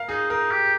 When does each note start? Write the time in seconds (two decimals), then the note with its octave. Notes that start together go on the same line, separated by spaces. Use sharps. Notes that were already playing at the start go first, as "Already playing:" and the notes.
Already playing: A#4 F5
0.09 D#4 G#4
0.30 D#4 A#4
0.51 G4